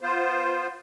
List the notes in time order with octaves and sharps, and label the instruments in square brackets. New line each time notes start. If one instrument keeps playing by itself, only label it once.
[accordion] B3 F4 C5